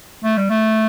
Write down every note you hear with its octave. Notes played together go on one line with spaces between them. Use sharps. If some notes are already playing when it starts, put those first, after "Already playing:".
A3
G3
A3